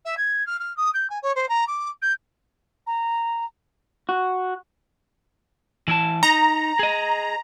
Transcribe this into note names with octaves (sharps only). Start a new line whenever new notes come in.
E5
G#6
F6
F6
D#6
G6
G#5
C#5
C5
A#5
D6
G6
A#5
F#4
E3 E4 A5
D#4 A#5
G#4 D#5